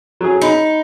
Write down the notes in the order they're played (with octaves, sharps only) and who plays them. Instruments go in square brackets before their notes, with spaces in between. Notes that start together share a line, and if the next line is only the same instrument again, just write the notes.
[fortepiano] F#3 G#4
[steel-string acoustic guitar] D#4 [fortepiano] B5